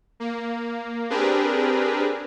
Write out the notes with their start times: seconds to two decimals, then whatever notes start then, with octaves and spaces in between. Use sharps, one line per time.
0.20 A#3
1.10 C4 D4 G4 G#4 A#4 B4